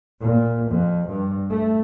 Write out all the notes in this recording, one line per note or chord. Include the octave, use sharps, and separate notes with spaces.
A#2
F2
G2
A3